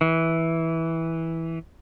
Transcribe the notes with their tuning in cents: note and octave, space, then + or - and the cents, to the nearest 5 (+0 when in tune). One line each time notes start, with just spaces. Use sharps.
E3 -10